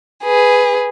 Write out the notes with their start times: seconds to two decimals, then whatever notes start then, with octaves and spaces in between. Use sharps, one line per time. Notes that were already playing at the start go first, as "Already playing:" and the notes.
0.24 G#4 B4